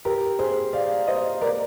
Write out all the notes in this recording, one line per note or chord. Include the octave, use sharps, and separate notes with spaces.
G4 A#4
G#4 C5
D5 F5
C5 D#5
A#4 D5